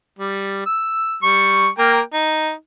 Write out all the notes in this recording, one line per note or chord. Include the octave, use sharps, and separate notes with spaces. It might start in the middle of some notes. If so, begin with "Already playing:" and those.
G3
E6
G3 C#6
A#3 A#4 G5
D#4